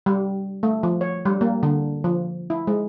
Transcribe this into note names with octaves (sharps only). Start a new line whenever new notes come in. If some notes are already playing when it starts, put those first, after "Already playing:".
G3
A3
F3
C#5
G3
A#3
D3
F3
E4
G#3